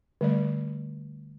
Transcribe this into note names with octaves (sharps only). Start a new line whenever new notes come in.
D3 G3 A3 D5